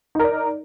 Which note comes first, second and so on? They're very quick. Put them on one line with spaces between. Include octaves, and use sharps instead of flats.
D#4 A#4 D5